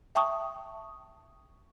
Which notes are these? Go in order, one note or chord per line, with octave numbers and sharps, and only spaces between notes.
E5 G5 A5 C#6 D#6